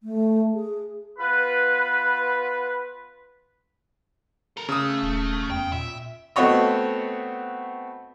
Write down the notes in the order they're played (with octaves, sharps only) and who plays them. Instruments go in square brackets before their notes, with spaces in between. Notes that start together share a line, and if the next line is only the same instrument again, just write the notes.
[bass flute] A3
G#4
[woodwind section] B3 F4 B4
[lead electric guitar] A4 A#4
[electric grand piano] C#3 D#6 [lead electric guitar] A3
[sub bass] D#1
[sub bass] E2 [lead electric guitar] G5
[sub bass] A#2 [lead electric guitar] E5
[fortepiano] A3 B3 C4 F#4 C#5 D#5